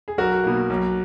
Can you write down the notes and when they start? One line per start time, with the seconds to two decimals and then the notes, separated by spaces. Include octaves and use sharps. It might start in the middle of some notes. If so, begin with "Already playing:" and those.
0.08 G#4
0.18 B1 F#4 A#4
0.44 B2 A#3
0.70 B1